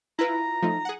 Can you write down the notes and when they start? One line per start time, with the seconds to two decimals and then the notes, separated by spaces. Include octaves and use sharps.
0.19 E4 F4 B4 A#5
0.62 F3 A3 D#4
0.85 G#4 F#5